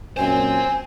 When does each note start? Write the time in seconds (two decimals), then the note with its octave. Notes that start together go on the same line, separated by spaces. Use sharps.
0.17 F#2 A#2 C5 G5 G#5